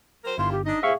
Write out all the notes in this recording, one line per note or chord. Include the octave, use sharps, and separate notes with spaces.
F#3 A#4 C5
G1 D#3 E4 F4 C6
G4
D4 D#4 D#5
A2 C3 G#4 E5 F5 C#6